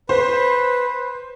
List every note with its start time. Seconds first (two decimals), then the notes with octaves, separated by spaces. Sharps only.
0.09 B4 C5